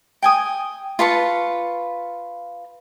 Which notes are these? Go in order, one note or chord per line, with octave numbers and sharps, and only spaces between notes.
G5 G#5 D#6
F4 B4 A5 C#6